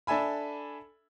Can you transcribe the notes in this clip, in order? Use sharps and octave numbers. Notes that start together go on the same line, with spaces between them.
D4 A4 E5 G#5 B5